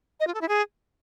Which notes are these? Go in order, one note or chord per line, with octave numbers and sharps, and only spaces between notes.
D#5
F4
A4
E4
G#4